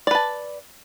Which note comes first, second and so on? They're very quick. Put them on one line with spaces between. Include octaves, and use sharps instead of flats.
D5 B4 A5